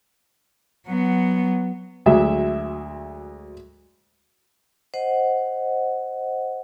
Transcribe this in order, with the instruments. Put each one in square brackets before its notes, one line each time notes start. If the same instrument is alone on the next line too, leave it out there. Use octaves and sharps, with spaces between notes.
[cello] F#3 B3
[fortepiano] D2 F#3 G#3 E5
[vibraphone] C5 D#5 F#5